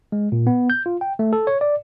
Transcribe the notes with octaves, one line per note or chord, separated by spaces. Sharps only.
G#3
A#2
B3
G6
F4
G5
A3
A4
C#5
D5